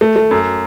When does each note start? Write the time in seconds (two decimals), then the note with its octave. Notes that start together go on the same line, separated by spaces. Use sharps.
0.01 A3
0.16 A3
0.31 F#2